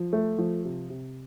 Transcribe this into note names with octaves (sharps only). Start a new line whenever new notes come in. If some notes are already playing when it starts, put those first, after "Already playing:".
Already playing: F3
A3
F3
C3
C3